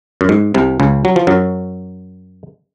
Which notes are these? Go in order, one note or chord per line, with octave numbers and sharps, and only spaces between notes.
F#2
G#2
C2 C3
C#2 C#3
F#3
F3
F#2 F#3